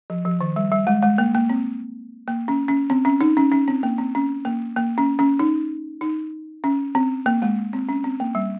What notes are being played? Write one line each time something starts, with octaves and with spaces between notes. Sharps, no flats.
F3
F3
D#3
G3
G3
G#3
G#3
A#3
A#3
C4
A#3
C#4
C#4
C4
C#4
D#4
C#4
C#4
C4
A#3
C4
C#4
A#3
A#3
C#4
C#4
D#4
D#4
C#4
C4
A#3
G#3
C4
C#4
C4
A#3
G3